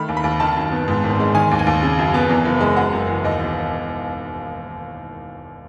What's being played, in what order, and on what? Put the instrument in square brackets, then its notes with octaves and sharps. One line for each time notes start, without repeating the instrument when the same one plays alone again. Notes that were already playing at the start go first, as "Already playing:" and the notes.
Already playing: [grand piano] D#3 A3 B5
D#2
B5
D#2
D#3 A5
F#2
B3
G#2
G#1
G#3
D#3 G#5
D#2
G#5
D#2
C#3
F#2
B3
E2
F#1
G#3
F#2 F#5
F#1
E3
D#2 D#5
E1